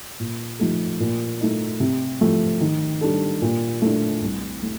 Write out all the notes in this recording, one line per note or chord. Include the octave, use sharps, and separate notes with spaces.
A#2
F3 A3 D#4 A4
A#2
A3 D#4
C3
F3 A3
D#3
G3 D4 A4
A#2
A3 D4
C2
A3